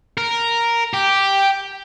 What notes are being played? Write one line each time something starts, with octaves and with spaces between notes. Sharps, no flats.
A#4
G4